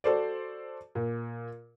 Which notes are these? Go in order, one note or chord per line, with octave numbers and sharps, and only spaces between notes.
F#4 A4 C5 D5
A#2